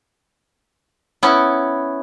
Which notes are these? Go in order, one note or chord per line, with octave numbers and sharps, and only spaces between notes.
B3 C#4 E4